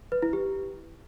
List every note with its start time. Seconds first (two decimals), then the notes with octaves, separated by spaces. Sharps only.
0.12 B4
0.22 E4
0.33 G4